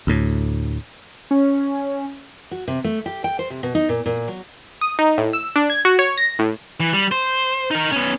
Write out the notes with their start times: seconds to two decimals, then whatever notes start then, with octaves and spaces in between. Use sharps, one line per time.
0.07 D2 A2
1.31 C#4
2.51 F#4
2.68 C3
2.84 A3
3.06 G4
3.24 G5
3.39 C5
3.50 C3
3.63 B2
3.75 D#4
3.89 A#2
4.06 A#2
4.28 F#3
4.81 D#6
4.99 D#4
5.18 A2
5.33 E6
5.56 D4
5.70 G#6
5.85 F#4
5.99 C#5
6.17 A#6
6.39 A2
6.80 E3
6.93 G3
7.11 C5
7.71 D#4 A#4
7.92 B3 C#4